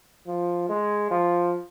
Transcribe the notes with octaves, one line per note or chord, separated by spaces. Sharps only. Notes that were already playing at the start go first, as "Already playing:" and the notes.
F3
G#3
F3